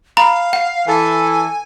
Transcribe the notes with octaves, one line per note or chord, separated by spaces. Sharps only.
F5 A#5 B5
F#5
E3 A4 G#5